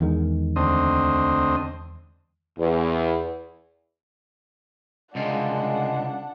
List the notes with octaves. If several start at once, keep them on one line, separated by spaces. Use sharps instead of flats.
E2 D#3 G#3
D2 C4 D#5
E2
C2 C#3 G#3 D4 F4 F#5